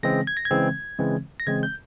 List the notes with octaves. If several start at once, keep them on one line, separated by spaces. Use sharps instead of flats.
C#3 E3 G#3 C4 A#6
G#6
A#6
G#6
C#3 E3 G#3 C4
C#3 E3 G#3 C4
A#6
C#3 E3 G#3 C4 G#6
G6